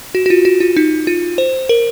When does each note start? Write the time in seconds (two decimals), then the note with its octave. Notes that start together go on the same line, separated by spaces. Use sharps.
0.15 F#4
0.26 F#4
0.30 F4
0.45 F#4
0.60 F4
0.77 D#4
1.07 F4
1.38 C5
1.69 A#4